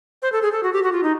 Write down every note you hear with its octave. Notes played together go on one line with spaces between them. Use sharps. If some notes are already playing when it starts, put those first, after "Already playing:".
C5
A4
G#4
A4
F#4
G4
F#4
F4
D#4